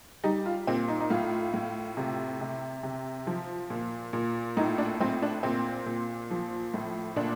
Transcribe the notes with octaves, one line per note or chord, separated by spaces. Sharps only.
G3 D#4
F4
A#2 C4
D#4
D#4
A2 F4
A2
C3
C3
C3
F3
A#2
A#2
A2 D#4
D4
A2 C4
D4
A#2 C4
A#2
F3
A2
A#2 D4